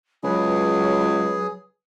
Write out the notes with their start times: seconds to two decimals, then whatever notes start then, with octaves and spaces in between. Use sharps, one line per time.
0.24 C#2 F#3 G#4 B4